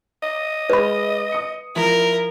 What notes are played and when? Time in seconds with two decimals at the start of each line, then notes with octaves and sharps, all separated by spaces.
0.23 D#5
0.70 G#3 B4 B5
1.32 D#6 C#7
1.76 F3 E4 A#4